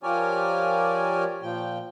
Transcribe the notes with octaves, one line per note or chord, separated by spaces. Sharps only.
F3 G4 A#4 C#5 D5 G#5
A#2 F3 G5